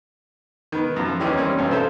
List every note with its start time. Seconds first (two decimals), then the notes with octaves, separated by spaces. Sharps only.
0.72 D#3 B3
0.96 F#2 F3
1.20 D#2 E3 C#4 E4 G4
1.37 G3 A#3 C4 C#4
1.58 E2 G2 B2 C4 C#4
1.71 F4 A4 C5 E5